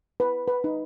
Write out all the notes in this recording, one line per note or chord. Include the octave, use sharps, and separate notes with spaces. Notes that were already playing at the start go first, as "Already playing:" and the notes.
B4
B4
D#4